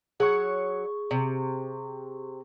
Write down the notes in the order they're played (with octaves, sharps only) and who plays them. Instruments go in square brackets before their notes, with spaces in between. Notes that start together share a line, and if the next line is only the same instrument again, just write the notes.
[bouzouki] F#3 C#5 F#5 [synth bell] G#4 C#6
[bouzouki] C3